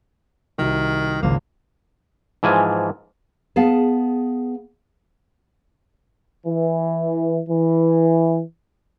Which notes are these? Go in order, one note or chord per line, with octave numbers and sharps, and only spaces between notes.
C2 D#3 F#4
G#1 C#2 A#3
G#2 E3 F3 G#5
B3 G#4 F5 A5
E3
E3